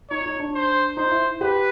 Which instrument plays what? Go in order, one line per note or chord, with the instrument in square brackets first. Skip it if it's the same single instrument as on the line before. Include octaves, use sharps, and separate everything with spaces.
[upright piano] D#4 [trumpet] C#5
[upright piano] D#4
D4
[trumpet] C5
[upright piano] D#4 [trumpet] C5
[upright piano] E4
[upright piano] G4 [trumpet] B4